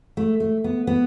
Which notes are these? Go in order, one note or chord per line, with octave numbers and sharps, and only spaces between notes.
A3
A3
B3
B3